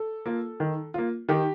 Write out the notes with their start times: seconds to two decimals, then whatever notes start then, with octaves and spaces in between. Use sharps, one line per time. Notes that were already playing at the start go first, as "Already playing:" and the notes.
Already playing: A4
0.26 A#3 F4
0.60 D#3
0.94 A#3 F4
1.29 D#3 G4